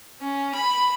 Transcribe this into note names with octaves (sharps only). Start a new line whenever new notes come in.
C#4
B5